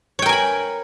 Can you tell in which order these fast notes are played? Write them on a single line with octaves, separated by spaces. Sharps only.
C#5 G5 A#4 G#5 B5